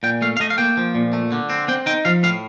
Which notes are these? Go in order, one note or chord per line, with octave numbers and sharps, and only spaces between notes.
A#2 G5
A3 F5
F5
A3 D#5
F5
A#3 G5
F3
A#2
A3
D3
C4
C4 G5
D#4 G5
F3 F5
A2 F5